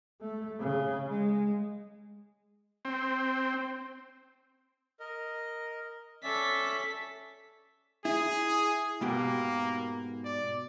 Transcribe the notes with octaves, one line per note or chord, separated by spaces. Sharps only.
A3
C#3
G#3
C4
A#4 D#5
C#4 A4 D5 E5 B6
E4 G#4
G#2 B2 A#3 G4
D5